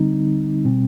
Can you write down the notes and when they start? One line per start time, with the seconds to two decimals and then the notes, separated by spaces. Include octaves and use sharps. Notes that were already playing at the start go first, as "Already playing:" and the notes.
Already playing: D3 G3 C4 D#4
0.65 B2 G3 C4